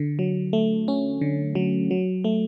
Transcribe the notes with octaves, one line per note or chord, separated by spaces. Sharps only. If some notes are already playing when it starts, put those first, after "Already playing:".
Already playing: D3
F#3
A3
C#4
D3
F#3
F#3
A3